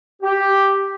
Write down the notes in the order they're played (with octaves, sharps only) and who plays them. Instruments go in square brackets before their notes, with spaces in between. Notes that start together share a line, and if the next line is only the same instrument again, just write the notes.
[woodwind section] G4